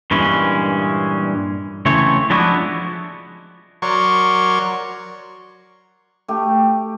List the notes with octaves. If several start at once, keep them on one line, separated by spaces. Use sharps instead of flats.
G2 A#2 E3 G#3 C#4
C#3 E3 A3 C4 C#5
F3 G#3 B3 D4 E4 F#4
F#3 A#4 C#5 D5 C6 C#6
A3 G4